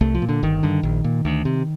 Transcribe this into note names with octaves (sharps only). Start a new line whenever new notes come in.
C2 A3
F3
A#2
D3
G1 D#3
G2 D3
A#1
A#2
D2
C3